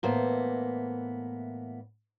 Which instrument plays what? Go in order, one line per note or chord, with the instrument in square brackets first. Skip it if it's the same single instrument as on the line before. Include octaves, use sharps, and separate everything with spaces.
[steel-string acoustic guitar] A2 E3 A#3 B3 C5